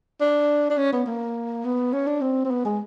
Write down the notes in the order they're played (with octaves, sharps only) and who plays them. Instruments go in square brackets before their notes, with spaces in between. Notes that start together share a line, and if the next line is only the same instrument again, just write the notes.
[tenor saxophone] D4
D4
C#4
B3
A#3
B3
C#4
D4
C4
C4
B3
G#3